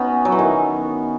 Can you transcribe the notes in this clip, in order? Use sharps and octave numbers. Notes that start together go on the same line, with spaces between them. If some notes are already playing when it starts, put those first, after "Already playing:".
Already playing: B3 C#4 D#4 F#4
F#3
E3
D#3